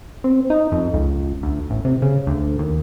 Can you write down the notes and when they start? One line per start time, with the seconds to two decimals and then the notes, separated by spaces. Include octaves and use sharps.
0.24 C4
0.50 D#4
0.72 F2
0.94 C#2
1.43 D2
1.70 A1
1.85 C3
2.02 C#3
2.27 D2
2.59 D#2